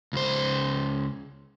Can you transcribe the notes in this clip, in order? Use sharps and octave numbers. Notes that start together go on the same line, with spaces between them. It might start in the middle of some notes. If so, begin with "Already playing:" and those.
C#2 C5